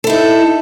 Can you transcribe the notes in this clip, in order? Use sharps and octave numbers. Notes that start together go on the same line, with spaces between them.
D#4 E4 A4